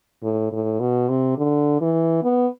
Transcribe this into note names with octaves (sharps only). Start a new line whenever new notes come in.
A2
A2
B2
C3
D3
E3
B3